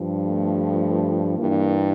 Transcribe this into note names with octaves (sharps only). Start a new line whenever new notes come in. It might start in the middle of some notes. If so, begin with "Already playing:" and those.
Already playing: G2 F3
A3
G2 E3 A#3